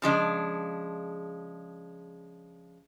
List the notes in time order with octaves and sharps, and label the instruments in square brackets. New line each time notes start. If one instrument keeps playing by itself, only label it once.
[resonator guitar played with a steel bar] C#3 F3 G#3 D4